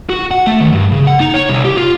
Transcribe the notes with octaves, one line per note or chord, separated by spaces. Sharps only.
F#4
F#5
A3
D#3
G2
C#3
F#5
D#4
C#5
C2
G4
F4